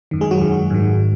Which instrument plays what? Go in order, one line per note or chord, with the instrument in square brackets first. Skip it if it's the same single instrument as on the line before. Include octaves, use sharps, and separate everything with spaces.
[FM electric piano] F#2 D#3
G#3 G#4
F#3 F#4
F#2 D#3
G#2 D#3